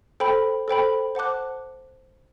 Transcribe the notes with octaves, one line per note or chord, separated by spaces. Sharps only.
A4 C5 G5 B5
A4 C5 G5 B5
C5 F#5 A5 D6 F#6